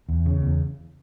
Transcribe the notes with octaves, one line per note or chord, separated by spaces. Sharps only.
E2
C#3
E2